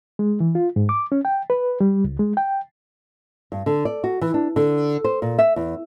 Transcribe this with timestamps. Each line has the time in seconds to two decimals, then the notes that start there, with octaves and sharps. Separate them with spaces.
0.19 G#3
0.40 E3
0.55 F4
0.76 G#2
0.89 D6
1.12 C#4
1.25 G5
1.50 B4
1.81 G3
2.04 C#2
2.19 G#3
2.37 G5
3.52 G2
3.66 D3
3.85 D5
4.04 F#4
4.21 E3
4.34 D4
4.56 D3
5.04 C5
5.22 A#2
5.39 E5
5.56 E2